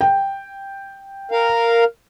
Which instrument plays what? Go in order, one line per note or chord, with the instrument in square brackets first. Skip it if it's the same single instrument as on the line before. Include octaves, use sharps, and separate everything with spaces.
[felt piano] G5
[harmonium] A#4 F5